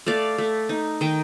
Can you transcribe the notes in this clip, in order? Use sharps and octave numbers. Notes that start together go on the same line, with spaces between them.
A3 D5 F5
A3
D#4
D#3 D#5 G5